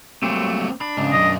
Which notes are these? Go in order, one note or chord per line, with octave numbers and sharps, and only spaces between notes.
F#3 G3 A3 A#3 C4
D4 B5
G#2 C#3
B1 F#2 D#5